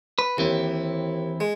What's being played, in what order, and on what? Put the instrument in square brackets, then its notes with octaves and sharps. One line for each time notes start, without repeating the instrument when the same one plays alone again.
[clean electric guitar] B4
[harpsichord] D#2 [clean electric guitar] E3 C4 E4
[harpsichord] G#3